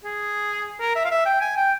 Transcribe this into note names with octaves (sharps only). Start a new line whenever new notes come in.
G#4
A#4
E5
F5
E5
G5
G#5
G5